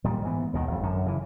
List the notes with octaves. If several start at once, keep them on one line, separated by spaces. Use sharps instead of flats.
A#2 D#3 G3
G#2 E3 B3
D#2 B2 D#3
G#1 F2
F#2 D3
C#3 E3